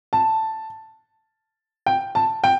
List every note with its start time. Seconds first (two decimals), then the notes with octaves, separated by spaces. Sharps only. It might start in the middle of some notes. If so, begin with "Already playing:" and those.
0.13 A5
1.86 G5
2.15 A5
2.44 G5